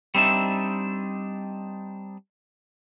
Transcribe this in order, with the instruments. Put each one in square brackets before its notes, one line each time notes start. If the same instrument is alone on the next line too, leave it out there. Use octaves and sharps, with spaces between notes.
[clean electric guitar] G3 C4 D4 D#4 E5